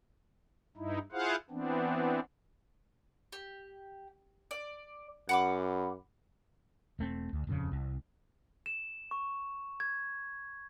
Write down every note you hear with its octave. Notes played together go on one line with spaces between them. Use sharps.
G2 D#4 E4
E4 F4 G#4 C5 F5 F#5
E3 B3 C4 D4
G4
D5
F#2 F#5 B5 D6
E1 A3 C4
D2
D#1 F2 C#3
C2
E7
C#6
G#6